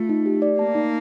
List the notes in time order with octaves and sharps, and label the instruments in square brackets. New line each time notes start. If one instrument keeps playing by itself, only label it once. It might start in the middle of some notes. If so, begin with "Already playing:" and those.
Already playing: [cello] A3 [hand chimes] F4
[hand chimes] D#4
G4
D5
[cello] A#3 [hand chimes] A5
[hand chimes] D#4